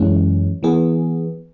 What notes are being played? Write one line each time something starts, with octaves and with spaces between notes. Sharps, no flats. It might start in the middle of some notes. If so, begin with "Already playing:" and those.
Already playing: F#2 E3 G#3 C#4
E3 B3 G#4